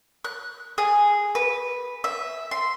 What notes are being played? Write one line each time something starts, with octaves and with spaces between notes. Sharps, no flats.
F#6
G#4
B4
E5
C6